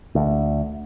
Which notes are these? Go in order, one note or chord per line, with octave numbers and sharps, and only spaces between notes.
D2